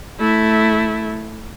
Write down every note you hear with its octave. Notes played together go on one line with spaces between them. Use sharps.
A3 E4